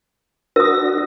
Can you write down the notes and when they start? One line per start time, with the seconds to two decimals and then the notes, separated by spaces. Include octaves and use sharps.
0.56 D4 F#4 A#4 D#6 A#6